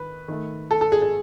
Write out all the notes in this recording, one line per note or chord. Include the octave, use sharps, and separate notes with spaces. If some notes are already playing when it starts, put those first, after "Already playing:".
Already playing: D#3 B4
D#3 A3
A4
A4
G#4
G#4